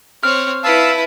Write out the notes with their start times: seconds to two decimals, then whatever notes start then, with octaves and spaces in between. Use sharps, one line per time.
0.23 C4 C#5 F6
0.64 E4 B4 F5 A5 E6